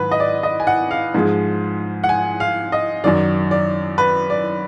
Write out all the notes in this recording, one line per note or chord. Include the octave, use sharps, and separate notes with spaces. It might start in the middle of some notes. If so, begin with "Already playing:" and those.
Already playing: G#2 D#3 F#3 B4
D#5
D5
D#5
G#5
F#5
F5
G#2 F3 G#3
F#5
G#5
F5
D#5
F#2 D#3 F#3 D5
D5
B4
D5